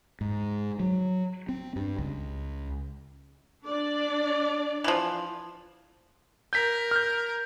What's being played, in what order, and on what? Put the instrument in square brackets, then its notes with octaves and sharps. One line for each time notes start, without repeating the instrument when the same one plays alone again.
[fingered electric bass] G#2
F#3
C4
G2
C#2
[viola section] D4 D5
[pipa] E3 F3
[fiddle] A#4 [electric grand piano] G6 B6
[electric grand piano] F6 G6